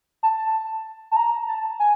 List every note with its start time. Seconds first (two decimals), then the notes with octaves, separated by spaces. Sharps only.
0.23 A5
1.11 A5
1.16 A#5
1.48 A5
1.79 G#5